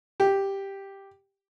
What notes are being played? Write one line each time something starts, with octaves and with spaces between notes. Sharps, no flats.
G4